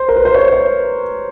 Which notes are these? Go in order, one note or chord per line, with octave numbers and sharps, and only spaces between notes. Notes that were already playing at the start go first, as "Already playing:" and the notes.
Already playing: C5
A#4
B4
C5
C#5
C#5